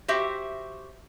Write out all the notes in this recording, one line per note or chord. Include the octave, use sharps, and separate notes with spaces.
F#4 G4 C5 E5